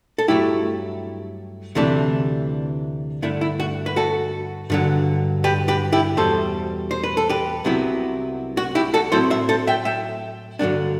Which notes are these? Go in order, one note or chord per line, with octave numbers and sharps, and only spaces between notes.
A4
G2 F#3 A3 E4 G4
D2 C3 E3 A3 D4
G2 D3 A3 D4 E4
E4
F#4
B4
F#4 A4
G2 D3 F#3
G4 B4
G4 B4
E4 G4
E2 B2 G3 A4 C5
C5
B4
A4
G4 B4
C2 C3 F#3 B3 E4
F#4
E4 G4
F#4 A4
A2 F#3 C4 E4 A4 C5
C5 E5
A4 C5
E5 G5
E5 G5
G2 D3 F#3 B3 D4